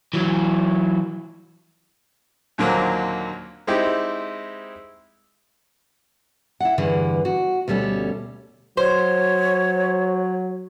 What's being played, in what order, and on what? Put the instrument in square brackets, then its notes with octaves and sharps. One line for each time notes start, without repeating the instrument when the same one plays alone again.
[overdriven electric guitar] E3 F#3
[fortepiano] D#2 A#2 D3 F#3 A#3 C4
G#3 C4 D#4 E4 G4
[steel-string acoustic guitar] E4 F#5
E2 G2 D3 E3
F#4
D2 B2 G3 C#4 A4
[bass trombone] F#3 [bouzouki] C5 [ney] C#5